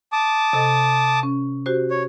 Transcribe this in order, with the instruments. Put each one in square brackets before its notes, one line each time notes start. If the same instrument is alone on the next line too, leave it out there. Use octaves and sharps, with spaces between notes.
[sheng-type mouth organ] A5 D6 D#6
[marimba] C3 A4 D#5
C#4
F#4 G4 C5
[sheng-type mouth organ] C#5